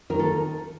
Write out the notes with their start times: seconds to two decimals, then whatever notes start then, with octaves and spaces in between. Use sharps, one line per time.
0.10 D#3 A#4
0.19 A4